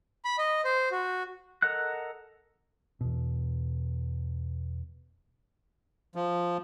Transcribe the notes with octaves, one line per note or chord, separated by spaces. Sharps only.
B5
D#5
C5
F#4
A4 A#4 D#5 F#5 F#6
E2 B2
F3